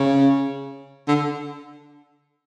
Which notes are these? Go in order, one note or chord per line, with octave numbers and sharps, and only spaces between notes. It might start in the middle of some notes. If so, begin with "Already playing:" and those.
Already playing: C#3
D3